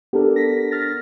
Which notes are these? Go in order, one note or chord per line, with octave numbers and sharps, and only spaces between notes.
B3 D4 G4 A4 A#4
A#6 B6
F6 A6 A#6